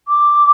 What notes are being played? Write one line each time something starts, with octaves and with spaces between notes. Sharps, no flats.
D6